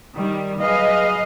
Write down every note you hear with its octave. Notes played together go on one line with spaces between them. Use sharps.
D#3 G3
F#3 G#4 B4 D#5 F5